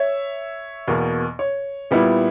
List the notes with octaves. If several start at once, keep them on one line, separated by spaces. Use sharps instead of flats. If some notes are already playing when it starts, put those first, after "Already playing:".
Already playing: C#5 E5
E2 B2 A#3
C#5
A#2 G3 B3 E4